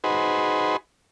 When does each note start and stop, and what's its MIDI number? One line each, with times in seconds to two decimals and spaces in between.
0.04 0.77 63
0.04 0.77 66
0.04 0.77 68
0.04 0.77 71
0.04 0.77 72